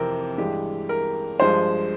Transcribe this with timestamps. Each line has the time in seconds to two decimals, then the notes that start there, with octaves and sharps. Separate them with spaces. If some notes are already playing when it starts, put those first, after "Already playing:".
Already playing: F2 C3 E3 C4 A#4
0.38 G2 E3 G#3 G4
0.89 A#4
1.40 G2 F3 G#3 C5